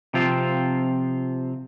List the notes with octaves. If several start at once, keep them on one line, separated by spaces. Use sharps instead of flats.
C3 F3 C4 F4